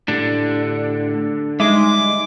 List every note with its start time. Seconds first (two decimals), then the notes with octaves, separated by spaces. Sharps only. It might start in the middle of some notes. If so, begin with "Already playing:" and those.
0.08 A2 D3 D4 G4
1.60 G3 G#3 D#4 E5 D6